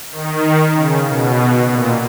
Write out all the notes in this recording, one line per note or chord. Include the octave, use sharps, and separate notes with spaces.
D#3
C#3
B2
A#2